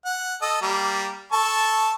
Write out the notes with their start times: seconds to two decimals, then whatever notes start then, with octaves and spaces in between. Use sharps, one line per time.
0.05 F#5
0.42 A4 D#5
0.62 G3 A#3
1.33 A4 A5 C#6